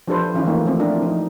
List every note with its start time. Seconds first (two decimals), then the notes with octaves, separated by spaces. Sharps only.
0.08 F3 D4 G4 A4 B4 C5
0.34 D#3 E3 C#4 D#4 F4
0.46 D#3 A3 A#3
0.66 F3 A3 C4
0.79 C4 D4 E4 A#4
1.02 F3 D#4